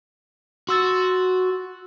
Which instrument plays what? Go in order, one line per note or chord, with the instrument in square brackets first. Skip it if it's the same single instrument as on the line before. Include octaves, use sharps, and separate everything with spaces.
[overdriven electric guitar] F#4 [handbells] C6 E6 A6